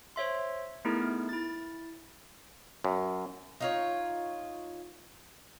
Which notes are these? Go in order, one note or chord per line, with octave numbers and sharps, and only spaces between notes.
C5 C#5 E5 C6
A3 B3 D#4 E4 G#4 A#4
E4 A6
F#2
D#4 F4 C#5